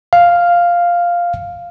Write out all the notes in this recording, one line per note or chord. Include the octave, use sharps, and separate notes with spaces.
F5